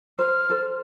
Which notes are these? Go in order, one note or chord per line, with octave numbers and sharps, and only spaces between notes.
C5 F6
A4 C5